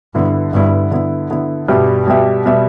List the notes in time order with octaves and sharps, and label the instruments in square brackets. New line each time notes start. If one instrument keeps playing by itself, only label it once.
[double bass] G2 [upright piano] D3 B3 E4
[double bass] G2 [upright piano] D3 B3 E4
[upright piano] D3 B3 E4
D3 B3 E4
[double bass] G2 [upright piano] B2 G3 B3 G4 E5
[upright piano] B2 G3 B3 G4 E5
B2 G3 B3 G4 E5